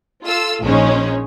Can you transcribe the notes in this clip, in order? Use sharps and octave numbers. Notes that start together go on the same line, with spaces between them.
F4 A4 F5 E6
A#1 F3 G#3 C#4 D#4 C#5